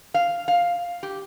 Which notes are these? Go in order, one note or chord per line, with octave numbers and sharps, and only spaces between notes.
F5
F5
G4